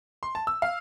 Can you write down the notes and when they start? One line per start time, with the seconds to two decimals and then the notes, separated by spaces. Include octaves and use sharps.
0.23 C6
0.35 A5
0.47 E6
0.62 F5